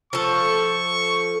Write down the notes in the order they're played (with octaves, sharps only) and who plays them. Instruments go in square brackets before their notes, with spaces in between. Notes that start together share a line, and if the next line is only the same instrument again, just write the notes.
[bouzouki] F3 A4 [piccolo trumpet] C#6